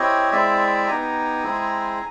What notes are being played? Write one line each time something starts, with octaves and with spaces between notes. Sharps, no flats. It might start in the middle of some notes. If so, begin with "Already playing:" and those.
Already playing: C4 E4 G4 C#5 D#5
G#3 C4 E4 D5 E5
B3 D#4 G4 G#5 A#5
G#3 C4 E4 G#4